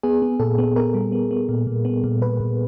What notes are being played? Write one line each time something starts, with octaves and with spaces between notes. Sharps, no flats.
B3 G#4
B3
A#2 A4
B3
B3 A#4
G3
B3
B3
A#2
A#2
B3
A#2
A#2 B4
A#2